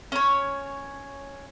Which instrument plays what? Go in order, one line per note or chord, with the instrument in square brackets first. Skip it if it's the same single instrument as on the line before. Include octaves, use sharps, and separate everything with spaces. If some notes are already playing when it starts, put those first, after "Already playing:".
[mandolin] C#4 C#5